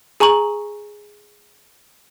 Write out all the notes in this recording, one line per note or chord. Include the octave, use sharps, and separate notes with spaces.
G#4 G#5 A#5 C#6 F#7